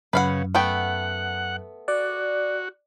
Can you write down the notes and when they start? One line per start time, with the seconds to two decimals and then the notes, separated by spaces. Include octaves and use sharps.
0.13 F#2 C#3 B4 F5 F#5
0.55 A3 B3 F#5 G5
1.88 F#4 D5